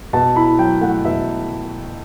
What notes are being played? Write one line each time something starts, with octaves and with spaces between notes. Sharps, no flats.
B2 A5
E4 B5
F#3 G5
A3 F#5
B2 E5